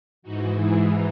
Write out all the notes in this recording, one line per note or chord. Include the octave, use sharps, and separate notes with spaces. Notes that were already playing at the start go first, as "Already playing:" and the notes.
G#2 E3 D#4 F#4
E4 G#4